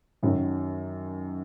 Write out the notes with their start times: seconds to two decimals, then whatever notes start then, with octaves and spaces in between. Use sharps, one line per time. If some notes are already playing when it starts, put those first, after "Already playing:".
0.23 F#2 D#3 F#3